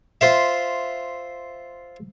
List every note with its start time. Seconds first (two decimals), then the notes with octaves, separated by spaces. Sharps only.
0.21 F4 C5 E5